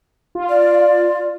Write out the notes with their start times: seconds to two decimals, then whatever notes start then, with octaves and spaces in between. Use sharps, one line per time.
0.35 F4
0.49 D5